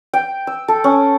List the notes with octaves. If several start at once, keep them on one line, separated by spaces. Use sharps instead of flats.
G5
E6
A4
C#4